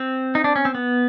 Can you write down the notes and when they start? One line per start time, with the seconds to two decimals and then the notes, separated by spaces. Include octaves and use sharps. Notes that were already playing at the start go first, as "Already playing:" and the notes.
Already playing: C4
0.35 D#4
0.44 D4
0.56 C#4
0.65 C4
0.75 B3